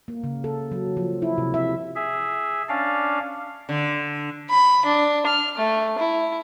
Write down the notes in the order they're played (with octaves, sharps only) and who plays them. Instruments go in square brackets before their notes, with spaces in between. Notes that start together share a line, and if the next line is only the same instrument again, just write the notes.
[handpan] A#3
C#3
A4
F#3
F3
E4
C3
E5
[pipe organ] G#4 E5
C#4 D4 D5 F5
[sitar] D3
[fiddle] B5
D4
F6
A3
E4